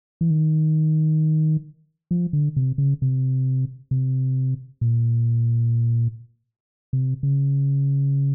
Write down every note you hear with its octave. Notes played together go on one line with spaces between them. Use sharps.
E3
D#3
F3
D3
C3
C#3
C3
C3
A#2
C3
C#3